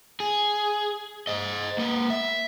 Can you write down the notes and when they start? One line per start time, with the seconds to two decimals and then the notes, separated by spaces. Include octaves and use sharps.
0.20 G#4
1.27 C5 D#5
1.78 A#3 B4
2.10 E5